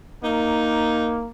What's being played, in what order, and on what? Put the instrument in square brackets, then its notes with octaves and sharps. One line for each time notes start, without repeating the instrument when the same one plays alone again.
[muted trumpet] A#3 [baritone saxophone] D#4